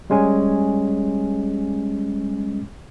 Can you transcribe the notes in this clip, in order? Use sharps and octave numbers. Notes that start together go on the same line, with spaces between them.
G3 G#3 C#4 G#5